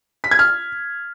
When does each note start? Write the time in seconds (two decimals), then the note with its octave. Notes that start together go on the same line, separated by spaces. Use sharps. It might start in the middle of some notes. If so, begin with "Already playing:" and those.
0.24 B6
0.31 G#6
0.39 F6